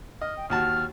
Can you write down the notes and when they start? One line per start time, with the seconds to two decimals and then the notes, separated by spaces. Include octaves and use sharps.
0.21 D#5 F6
0.37 G5
0.50 D#2 F#4 A5 F6